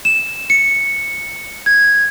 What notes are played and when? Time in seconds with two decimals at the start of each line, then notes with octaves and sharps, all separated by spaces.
0.05 E7
0.50 C#7
1.66 G#6